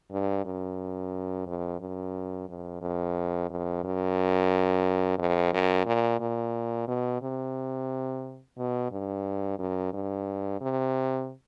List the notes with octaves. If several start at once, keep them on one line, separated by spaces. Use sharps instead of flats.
G2
F#2
F2
F#2
F2
F2
F2
F#2
F2
F#2
A#2
A#2
B2
C3
B2
G2
F#2
G2
C3